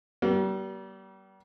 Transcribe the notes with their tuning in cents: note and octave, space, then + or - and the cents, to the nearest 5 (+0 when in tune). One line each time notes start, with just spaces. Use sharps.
G3 -35 A#3 +45